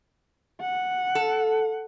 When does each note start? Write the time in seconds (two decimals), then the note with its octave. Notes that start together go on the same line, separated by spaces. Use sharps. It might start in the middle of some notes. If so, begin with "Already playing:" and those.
0.61 F#5
1.15 A4